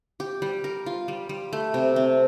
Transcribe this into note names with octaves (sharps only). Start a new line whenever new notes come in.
G4
G3
A#4
F4
G3
G3
A3
C3
C4